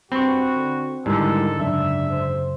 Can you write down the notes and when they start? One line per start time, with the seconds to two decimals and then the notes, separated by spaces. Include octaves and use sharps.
0.12 G2 C4 F#4 B5 C#6
0.56 D3
1.06 G#2 D3 D#3 G3 G#3 E4 A4
1.60 F#2 C#3 D4 E5
2.10 C5